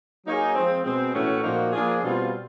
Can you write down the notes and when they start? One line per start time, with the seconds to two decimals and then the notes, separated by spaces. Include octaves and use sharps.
0.25 F#3 A#3 D#4 G#4 C#5
0.55 F3 G#3 C4
0.84 B2 G#3 C4
1.14 A2 E3 A3 C#4 F#4
1.44 A#2 F3 A#3 D#4 F#4
1.73 F3 A#3 D4 F4 G#4
2.03 B2 G3 C4 F4